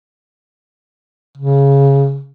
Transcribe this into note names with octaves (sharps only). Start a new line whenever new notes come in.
C#3